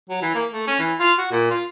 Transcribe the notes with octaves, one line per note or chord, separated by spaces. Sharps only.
F#3
E3
A#3
A3
C#4
E3
F4
F#4
A#2
F4